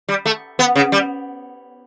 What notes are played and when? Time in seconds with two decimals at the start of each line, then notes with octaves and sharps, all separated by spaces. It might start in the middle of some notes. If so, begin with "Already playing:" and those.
0.09 G3
0.26 A3
0.59 B3
0.75 C#3
0.92 G3